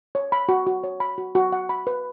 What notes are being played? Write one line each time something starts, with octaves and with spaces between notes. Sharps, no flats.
C#5
B5
F#4
F#4
C#5
B5
F#4
F#4
F#5
B5
B4